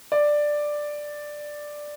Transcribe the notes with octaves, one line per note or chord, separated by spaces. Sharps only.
D5